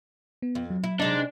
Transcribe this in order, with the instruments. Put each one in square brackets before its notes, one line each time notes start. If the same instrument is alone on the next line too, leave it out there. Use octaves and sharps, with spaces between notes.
[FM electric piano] B3
[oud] F2
[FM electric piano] F#3
[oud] E4
[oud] C3 G#3 D#4 [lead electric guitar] D4